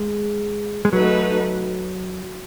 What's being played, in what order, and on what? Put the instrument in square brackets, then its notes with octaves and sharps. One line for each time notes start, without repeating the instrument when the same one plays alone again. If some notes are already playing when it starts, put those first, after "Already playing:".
Already playing: [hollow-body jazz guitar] G#3
G#3
[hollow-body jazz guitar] F#3 [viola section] A3 D#4 F#4 B4